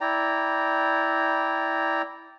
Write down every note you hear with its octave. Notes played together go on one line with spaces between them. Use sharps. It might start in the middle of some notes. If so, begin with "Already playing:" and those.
E4 D5 G5 A#5